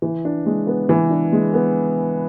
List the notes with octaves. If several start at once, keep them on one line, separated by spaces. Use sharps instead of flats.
E3
D4
G#3
B3
E3
D4
G#3
B3